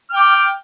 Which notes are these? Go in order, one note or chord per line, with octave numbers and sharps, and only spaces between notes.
G5 D6 F6